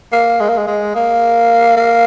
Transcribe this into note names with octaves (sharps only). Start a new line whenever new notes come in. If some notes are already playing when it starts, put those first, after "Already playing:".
A#3
G#3
A#3
G#3
G#3
A#3
A#3